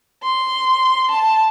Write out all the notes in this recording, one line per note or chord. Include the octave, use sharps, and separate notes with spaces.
C6
A5